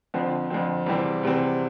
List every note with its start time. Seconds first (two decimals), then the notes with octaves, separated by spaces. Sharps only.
0.14 F2 D3 F3 C4
0.50 F2 D3 F3 C4
0.86 E2 C3 G3 C4
1.23 E2 C3 G3 C4